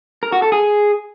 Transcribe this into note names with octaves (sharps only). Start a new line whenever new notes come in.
A#4
F#4
A4
G#4